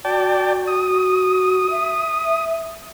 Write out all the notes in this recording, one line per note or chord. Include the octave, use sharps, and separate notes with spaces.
F#4 D5 G5 A5
D#6
E5